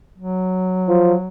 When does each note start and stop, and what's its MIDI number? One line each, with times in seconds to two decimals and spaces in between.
0.18 1.28 54
0.89 1.13 53